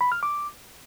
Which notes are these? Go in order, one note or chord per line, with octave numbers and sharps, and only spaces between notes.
B5
F6
D6